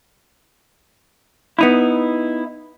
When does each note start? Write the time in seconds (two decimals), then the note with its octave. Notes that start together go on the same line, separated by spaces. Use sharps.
1.59 B3 D#4 E4